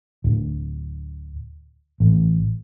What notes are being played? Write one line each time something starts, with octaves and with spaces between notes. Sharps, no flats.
D1
A1